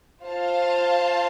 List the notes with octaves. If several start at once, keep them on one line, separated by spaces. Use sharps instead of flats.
F4 C5 F5 A5